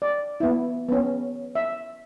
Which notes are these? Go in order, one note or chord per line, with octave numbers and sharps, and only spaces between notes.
D5
B3 E4
B3 C#4
E5